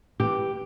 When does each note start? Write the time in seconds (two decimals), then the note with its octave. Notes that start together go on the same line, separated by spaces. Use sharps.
0.20 E3 G4